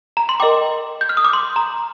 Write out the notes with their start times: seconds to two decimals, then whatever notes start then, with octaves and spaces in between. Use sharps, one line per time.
0.17 A#5
0.29 C6
0.40 A#4 D#5 G5 D6
1.01 G6
1.09 F6
1.17 D#6
1.25 D6
1.33 C6
1.56 A#5